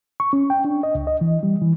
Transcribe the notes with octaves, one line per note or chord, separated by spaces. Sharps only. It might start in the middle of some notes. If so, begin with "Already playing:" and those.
C#6
C#4
G5
D4
D#5
C#2
D#5
E3
G3
E3